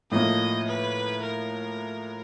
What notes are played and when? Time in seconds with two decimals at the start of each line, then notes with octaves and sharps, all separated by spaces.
0.11 A2 F3 A#3 D#5
0.67 B4
1.23 A#4